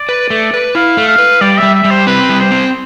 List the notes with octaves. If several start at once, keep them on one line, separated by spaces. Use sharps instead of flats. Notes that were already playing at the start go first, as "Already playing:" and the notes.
Already playing: D5
B4
A3
B4
E4 F5
A3
F5
B4
G3 D5
G3 E5
E5
G3
C5
C4 B4
G3
C5
C4